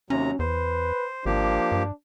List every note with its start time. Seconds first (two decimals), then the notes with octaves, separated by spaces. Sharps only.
0.10 D#2 C3 F#3 C#4 A#5
0.39 E2 B4 C5
1.26 G#1 F3 A#3 D4 G4
1.72 G2